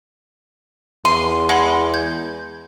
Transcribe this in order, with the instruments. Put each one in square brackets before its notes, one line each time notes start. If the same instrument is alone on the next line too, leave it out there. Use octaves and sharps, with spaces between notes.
[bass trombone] E2 [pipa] C6 [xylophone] D#7
[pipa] G#3 [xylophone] F#5 B5 C6
[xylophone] G6 G#6